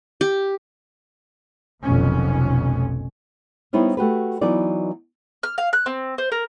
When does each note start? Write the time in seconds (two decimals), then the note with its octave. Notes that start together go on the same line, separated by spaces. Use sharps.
0.21 G4
1.82 F1 B1 F2 B2 D#3 C#4
3.73 G3 B3 D#4 E4 C5 C#5
3.97 A3 F#4 G4 B4
4.41 E3 F#3 B3 D#4 D5
5.43 F6
5.58 F5
5.73 F#6
5.86 C4
6.18 C5
6.32 A#4